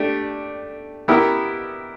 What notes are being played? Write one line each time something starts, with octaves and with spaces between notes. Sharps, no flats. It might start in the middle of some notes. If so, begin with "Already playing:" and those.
Already playing: A3 D4 G4
B3 E4 G4 A#4